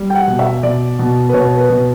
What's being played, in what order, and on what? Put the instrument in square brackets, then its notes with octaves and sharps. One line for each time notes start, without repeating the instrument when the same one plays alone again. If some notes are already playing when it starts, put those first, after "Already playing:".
Already playing: [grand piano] G3
G5
F#5
B2
E5
B2 D5
B2
B4
B2 C#5
B4
B2